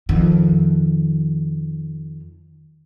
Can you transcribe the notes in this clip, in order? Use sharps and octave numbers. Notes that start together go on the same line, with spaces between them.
F2 D#3